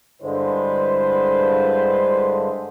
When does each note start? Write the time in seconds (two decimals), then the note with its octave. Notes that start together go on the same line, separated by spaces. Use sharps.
0.22 G2 D3 G#3 E4 B4 C5